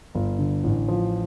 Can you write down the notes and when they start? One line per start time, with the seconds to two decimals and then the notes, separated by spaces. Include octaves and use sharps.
0.15 G1
0.39 D3
0.64 A1
0.88 F3